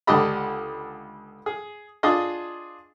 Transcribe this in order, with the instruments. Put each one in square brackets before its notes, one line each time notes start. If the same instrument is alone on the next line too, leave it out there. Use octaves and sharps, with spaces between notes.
[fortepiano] C#2 D3 D4 G4 D#5 B5
G#4
D4 F4 G#4 D#5